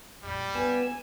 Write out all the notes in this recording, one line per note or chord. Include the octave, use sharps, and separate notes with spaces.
F2 A#2 G3
G2 B3 G#5 E6